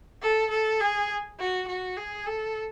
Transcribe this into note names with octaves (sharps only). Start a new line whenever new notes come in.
A4
A4
G#4
F#4
F#4
G#4
A4